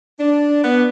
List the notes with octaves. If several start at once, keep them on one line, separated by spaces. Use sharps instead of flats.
D4
B3